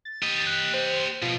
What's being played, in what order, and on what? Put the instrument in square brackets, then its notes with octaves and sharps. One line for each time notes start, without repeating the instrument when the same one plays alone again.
[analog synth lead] A6
[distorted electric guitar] G4 D#5
[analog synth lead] F#6
C5
[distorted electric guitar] B2 [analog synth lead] F3